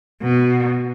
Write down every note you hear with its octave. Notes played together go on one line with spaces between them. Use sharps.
B2